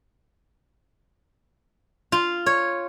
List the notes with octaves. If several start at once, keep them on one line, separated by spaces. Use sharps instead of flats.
F4
C#5